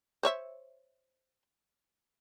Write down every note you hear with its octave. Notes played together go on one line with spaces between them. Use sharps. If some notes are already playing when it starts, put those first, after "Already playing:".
C5 C#5 E5